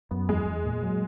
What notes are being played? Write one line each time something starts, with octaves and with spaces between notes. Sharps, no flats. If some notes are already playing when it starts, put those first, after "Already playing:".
F#2 B3
E2 G#3
E2
A#2
F#3